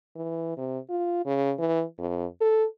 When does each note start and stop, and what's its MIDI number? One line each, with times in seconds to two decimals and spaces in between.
0.16 0.56 52
0.57 0.79 48
0.90 1.21 65
1.25 1.53 49
1.59 1.83 52
1.99 2.26 41
2.41 2.65 69